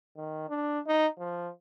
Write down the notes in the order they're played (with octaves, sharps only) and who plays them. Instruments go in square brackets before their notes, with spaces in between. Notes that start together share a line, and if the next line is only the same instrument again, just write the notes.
[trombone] D#3
D4
D#4
F3